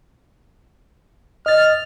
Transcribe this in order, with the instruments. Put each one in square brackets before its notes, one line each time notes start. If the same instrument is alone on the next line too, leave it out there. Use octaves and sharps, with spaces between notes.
[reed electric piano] D#5 A6 [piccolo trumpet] F6